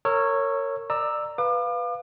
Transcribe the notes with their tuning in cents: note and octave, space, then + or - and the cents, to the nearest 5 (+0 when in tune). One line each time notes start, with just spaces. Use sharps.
A#4 -20 C#5 -5 E6 +5
D5 +25 A#5 +0 E6 +0
B4 +0 F5 +0 D6 +40